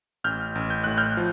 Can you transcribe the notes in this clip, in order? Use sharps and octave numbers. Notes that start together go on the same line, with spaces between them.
A1 F6 G6
A1
G6
A2 F#6
F6 G6
F3